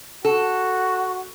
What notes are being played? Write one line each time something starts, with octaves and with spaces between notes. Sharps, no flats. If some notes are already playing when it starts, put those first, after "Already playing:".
F#4 A4